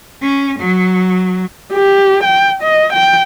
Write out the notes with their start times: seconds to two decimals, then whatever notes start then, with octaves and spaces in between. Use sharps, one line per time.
0.22 C#4
0.59 F#3
1.73 G4
2.24 G5
2.63 D#5
2.93 G5